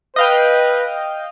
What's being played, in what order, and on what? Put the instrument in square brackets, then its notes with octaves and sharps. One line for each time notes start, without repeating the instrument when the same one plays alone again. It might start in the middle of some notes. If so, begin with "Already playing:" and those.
[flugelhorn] B4 [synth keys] D#5 F5 G5